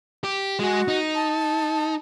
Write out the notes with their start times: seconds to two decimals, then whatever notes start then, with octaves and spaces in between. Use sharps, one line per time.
0.24 G4
0.59 G#3 F#4 G#4
0.88 D#4
1.15 A5